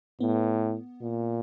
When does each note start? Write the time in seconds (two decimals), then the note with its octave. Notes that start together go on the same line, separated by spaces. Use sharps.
0.20 A2 B3
1.01 A#2